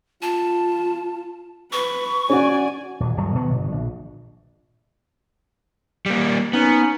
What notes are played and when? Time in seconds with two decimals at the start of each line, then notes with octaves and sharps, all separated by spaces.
0.22 F4 A5
1.73 B4 C#6
2.30 C#4 F#4 D5 F#5 G#5
3.00 D#1
3.17 D1 D2 G2 F#3
3.35 B2 D#3 F3 F#3
3.50 G1
3.72 A#1
6.06 G3 A#3
6.53 B3 C#4 D#4